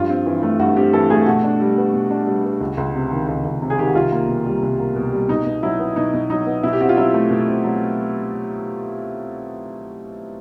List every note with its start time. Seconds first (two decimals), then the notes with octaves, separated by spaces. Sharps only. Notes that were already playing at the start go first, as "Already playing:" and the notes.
Already playing: G2 F3 F4
0.09 C4
0.26 E3
0.43 A3
0.59 G2 F#4
0.77 C4 G4
0.93 E3 A4
1.10 A3 G#4
1.26 B2 F#4
1.44 D4
1.60 G3
1.77 B3
1.93 B2
2.10 D4
2.27 G3
2.44 B3
2.60 C#2
2.77 C#2
2.95 C3
3.12 D#3
3.28 C#2
3.45 C#2
3.62 C3
3.70 G#4
3.79 D#3 G4
3.86 F#4
3.95 C2 F4
4.12 A#3
4.29 B2
4.45 G3
4.62 C2
4.79 A#3
4.96 B2
5.12 G3
5.29 B2 D#4
5.46 B2
5.63 F#3 E4
5.79 B3
5.96 B2 D#4
6.14 B2
6.30 F#3 D#4
6.46 B3
6.63 B2 E4
6.73 G4
6.81 C4 F#4
6.89 F4
6.97 F#3 E4
7.14 A3
7.30 B2
7.48 C4
7.64 F#3